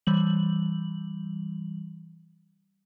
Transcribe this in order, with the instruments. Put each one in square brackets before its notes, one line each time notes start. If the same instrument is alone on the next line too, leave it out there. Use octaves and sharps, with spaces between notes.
[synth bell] E3 G3 F#7